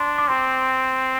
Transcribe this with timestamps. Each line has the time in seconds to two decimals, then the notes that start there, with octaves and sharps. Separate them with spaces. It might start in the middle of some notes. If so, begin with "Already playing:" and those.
Already playing: D4 C6
0.18 D6
0.28 C4 C6